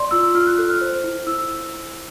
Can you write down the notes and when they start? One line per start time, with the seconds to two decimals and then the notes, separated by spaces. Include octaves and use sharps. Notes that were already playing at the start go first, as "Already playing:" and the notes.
Already playing: D5 C6
0.11 F4 E6
0.35 F4 F6
0.47 F#6
0.57 A4 F#6
0.70 F6
0.81 C5
1.04 E4
1.27 E4 E6